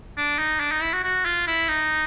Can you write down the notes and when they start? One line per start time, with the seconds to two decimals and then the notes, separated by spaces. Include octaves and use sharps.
0.17 D4
0.39 D#4
0.60 D4
0.71 D#4
0.82 E4
0.93 F#4
1.04 F#4
1.25 F4
1.47 E4
1.68 D#4